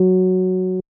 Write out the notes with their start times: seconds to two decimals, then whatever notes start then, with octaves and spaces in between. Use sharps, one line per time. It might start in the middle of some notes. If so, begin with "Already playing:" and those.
Already playing: F#3